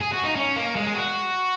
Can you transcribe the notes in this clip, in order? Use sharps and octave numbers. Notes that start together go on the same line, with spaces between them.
G#4
F#4
D#4
C#4
A#3
G#3
G#4
F#4